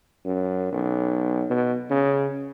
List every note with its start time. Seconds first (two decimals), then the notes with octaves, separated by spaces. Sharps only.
0.25 F#2
0.72 B1
1.50 B2
1.90 C#3